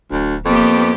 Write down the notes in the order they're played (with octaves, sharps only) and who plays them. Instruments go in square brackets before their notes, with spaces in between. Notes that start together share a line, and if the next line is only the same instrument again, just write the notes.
[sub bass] D1 [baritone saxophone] D2
[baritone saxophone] F2 [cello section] A#3 B3 G4